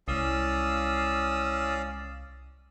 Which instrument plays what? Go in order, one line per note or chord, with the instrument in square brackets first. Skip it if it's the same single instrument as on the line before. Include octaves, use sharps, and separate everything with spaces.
[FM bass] C2 [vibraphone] G#3 E4 [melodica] C#4 D5 F5 [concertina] D#6 E6